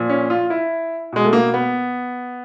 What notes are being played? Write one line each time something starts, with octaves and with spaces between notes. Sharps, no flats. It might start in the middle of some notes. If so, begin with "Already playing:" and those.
Already playing: A#2 F3
C#4
F4
E4
B2 G#3
A3
A#3
B3